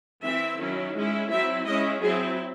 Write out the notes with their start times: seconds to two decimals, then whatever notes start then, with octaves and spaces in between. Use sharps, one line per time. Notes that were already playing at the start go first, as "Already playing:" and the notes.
0.22 E3 C4 E4 E5
0.59 D#3 F#3 C#4 E4
0.94 G#3 C#4 E4
1.30 F#3 C4 E4 E5
1.65 G#3 C#4 E4 D#5
2.01 F#3 C4 E4 G#4